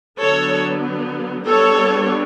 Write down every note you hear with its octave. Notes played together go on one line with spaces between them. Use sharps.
D3 F#3 B3 A4 C#5
G3 B3 D4 A4 C#5